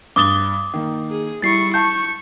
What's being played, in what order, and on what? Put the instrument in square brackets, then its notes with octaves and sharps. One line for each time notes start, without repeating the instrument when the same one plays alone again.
[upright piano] G2 A6 G7 [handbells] D6 D#6
[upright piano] D#3 A#3
[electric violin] G#4
[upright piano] G3 [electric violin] E4 C#6 [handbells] A6 C7
[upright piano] A5 [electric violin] C#6 [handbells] G6